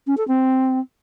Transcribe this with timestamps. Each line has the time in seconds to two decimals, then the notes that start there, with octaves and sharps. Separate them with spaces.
0.07 C#4
0.17 A4
0.28 C4